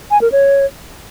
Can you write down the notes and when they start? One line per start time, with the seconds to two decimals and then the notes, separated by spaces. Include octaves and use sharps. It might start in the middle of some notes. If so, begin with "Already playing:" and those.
0.11 G#5
0.21 A#4
0.32 C#5